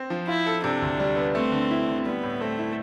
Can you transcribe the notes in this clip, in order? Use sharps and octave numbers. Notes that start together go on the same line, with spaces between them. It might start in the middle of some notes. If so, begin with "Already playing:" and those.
Already playing: C4
F3
E4 F4
A4
C3 D4
D2
G3
B3
A3 C4
D3
E4
D3
G3 B3
A2
A3 C4
E4